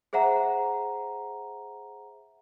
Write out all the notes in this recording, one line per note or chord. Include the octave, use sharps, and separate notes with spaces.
G#4 C5 E5 F#5 A#5